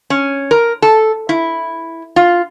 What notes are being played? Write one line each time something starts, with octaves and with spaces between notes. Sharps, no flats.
C#4
A#4
A4
E4
F4